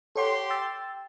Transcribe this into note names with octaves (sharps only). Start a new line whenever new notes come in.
G4 A4 C#5 F#5 C6
G5 E6 A6